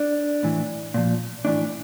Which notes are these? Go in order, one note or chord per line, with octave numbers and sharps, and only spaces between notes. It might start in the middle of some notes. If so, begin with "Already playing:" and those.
Already playing: D4
A2 E3
A#2 F3
A2 E3 D4